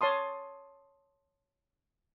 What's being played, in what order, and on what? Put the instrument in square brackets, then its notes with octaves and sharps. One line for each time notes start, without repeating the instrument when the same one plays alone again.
[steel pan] C#5 A5 C6 D#6